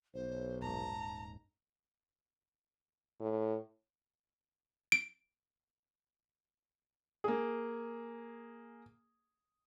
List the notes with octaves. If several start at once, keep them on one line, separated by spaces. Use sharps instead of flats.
B1 C5
D#1 G#2 A5 A#5
A2
D7
A#3 G#4